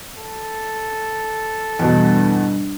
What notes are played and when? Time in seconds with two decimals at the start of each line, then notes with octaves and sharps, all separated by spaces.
0.18 A4
1.79 E2 G2 B2